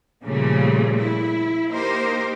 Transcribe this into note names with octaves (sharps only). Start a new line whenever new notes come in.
A#2 C#3 F3 G3 A3
E4
A#3 D#4 G4 A#4 C5